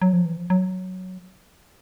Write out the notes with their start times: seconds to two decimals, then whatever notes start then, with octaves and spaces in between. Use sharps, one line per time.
0.02 F#3
0.13 F3
0.25 E3
0.37 F3
0.50 F#3